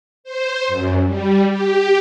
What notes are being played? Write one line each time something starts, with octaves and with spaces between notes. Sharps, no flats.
C5
F#2
G3
G4